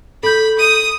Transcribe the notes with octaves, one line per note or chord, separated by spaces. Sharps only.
A4 B5 G6
D#6 D#7